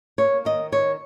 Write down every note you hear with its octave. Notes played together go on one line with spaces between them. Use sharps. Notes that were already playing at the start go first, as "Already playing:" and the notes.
A#3 C#5
D#3 D#5
D#3 C#5